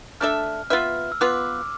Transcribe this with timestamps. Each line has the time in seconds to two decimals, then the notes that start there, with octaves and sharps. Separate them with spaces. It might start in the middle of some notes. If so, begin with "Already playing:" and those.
0.21 A3 D4 A4 E5 F6
0.70 B3 F4 B4 E5 F6
1.12 E6
1.21 B3 F4 B4 D6